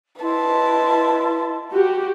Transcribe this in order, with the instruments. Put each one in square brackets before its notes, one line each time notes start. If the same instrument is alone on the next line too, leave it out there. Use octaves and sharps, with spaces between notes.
[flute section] E4 D#5 C6 [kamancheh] B4 A5
[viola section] F#4 G4